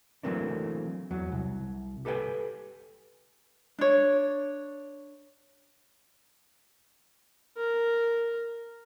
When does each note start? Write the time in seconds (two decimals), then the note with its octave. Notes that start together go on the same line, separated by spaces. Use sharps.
0.23 E3 F#3 A3 A#3 C4 D4
1.11 E2 F#3
1.32 C2
2.05 G4 A4 B4 D#5 G5 G#5
3.79 D4 C#5
7.57 A#4